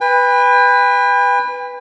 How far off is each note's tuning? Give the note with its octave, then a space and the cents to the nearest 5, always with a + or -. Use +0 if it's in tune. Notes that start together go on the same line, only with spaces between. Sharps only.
B4 +0 G5 +45